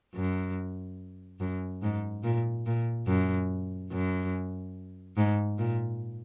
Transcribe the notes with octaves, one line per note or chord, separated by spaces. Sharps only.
F#2
F#2
G#2
A#2
A#2
F#2
F#2
G#2
A#2